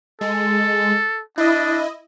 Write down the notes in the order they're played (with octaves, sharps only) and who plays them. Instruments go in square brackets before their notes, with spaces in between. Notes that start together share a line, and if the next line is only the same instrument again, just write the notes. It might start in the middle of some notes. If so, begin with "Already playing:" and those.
[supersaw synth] G#3 [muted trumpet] A4
[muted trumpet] D4 [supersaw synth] E4 D#5